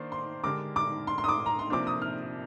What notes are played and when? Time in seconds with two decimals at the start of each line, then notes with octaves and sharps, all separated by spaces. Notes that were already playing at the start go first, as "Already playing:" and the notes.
Already playing: D#3 A#3 D4 C5
0.12 C6
0.44 D3 G#3 D4 G4 A#4 D6
0.76 D6
1.07 C6
1.18 C6
1.24 D#6
1.28 D6
1.46 A#5
1.59 C6
1.70 C3 F3 A#3 D4 D6
1.87 D#6
2.02 F6